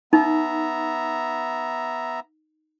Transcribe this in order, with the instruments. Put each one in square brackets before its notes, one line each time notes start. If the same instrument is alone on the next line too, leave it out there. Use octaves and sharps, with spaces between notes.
[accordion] B3 E5 A#5 [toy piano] D#4